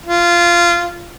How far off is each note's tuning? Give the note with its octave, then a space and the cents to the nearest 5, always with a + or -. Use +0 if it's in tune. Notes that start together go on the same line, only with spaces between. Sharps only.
F4 -15